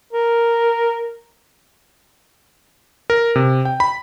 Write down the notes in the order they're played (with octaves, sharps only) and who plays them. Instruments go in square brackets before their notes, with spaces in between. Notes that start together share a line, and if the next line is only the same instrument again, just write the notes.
[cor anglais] A#4
[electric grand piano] A#4
C3
G5
B5